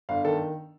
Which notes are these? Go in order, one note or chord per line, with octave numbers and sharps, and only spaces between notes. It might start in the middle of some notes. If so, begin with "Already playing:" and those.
G1 F5
D#3 A4